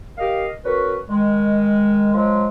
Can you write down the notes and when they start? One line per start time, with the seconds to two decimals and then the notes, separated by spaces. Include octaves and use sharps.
0.18 G4 A#4 D#5 F5
0.65 C#4 F#4 A#4 B4
1.08 D#3 G#3
2.14 F3 F#3 G#3